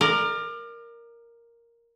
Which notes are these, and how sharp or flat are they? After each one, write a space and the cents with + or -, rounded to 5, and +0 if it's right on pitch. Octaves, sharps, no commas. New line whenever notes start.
A#4 +0 D5 +35